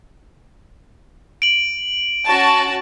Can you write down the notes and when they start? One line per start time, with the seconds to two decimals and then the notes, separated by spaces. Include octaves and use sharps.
1.42 D7 F#7
2.25 C#4 F#4 A5